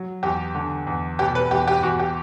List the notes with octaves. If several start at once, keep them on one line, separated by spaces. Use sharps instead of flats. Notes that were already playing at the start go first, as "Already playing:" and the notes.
Already playing: F#3
E2 G4
D3
E2
B2 G4
B4
E2 G4
G4
E2 F#4
G4